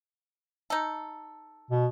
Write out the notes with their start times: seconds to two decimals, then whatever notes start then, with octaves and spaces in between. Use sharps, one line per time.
0.70 D#4 A4
1.71 B2